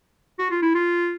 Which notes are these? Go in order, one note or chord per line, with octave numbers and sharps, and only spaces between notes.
F#4
F4
E4
F4